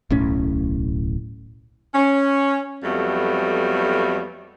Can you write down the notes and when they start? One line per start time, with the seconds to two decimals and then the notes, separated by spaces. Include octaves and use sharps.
0.10 D1 B1 A2 C#4
1.94 C#4
2.84 F2 F#3 G3 A3 B3